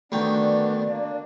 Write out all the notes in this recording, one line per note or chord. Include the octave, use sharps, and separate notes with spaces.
D2 D#3 B3 D4 D5 G5
A#3 D4